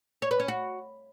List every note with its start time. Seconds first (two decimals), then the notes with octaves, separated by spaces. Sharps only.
0.22 C#5
0.31 B4
0.40 C#4
0.48 F#4